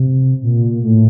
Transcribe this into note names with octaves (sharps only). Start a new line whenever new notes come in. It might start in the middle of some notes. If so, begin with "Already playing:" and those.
Already playing: C3
A#2
A2